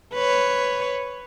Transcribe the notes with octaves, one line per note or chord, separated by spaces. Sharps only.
B4 C#5